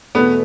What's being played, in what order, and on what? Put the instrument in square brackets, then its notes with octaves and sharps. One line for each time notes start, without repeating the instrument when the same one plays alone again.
[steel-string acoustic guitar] E2 B2 A3 [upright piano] B3